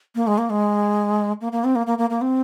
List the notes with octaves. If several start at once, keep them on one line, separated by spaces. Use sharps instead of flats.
A#3
G#3
A#3
G#3
A#3
A#3
C4
A#3
A#3
A#3
A#3
C4